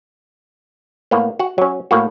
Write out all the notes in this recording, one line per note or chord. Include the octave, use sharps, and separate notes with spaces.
A2 A#3 B3
F#4 F#5
F#3 C#4
A2 A#3 F#4